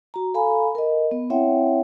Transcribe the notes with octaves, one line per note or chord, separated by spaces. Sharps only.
F#4 A#5
A4 F5 G#5 A#5 B5
A#4 D#5
B3
C4 E4 C#5 E5 F#5 G5